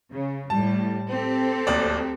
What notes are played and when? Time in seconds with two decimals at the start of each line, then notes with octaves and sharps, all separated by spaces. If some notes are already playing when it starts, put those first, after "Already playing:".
0.13 C#3
0.50 A2 G3 A5
1.10 C4 G4 A4
1.67 D1 D#2 D5